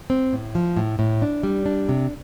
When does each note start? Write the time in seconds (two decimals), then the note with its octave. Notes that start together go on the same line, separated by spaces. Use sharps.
0.10 C4
0.33 A2
0.55 F3
0.77 A2
0.99 A2
1.22 D4
1.43 G3
1.66 D4
1.89 C3